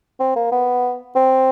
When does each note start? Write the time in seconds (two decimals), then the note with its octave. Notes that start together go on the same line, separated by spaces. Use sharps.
0.20 C4
0.36 A#3
0.52 B3
1.15 C4